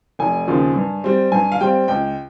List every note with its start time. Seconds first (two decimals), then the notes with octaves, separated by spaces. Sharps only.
0.19 F1 G#5
0.48 D#2 C#3 F3
0.76 G2
1.04 G3 C4
1.32 G2 G#5
1.52 F5
1.61 G3 C4 G5
1.88 C#2 G5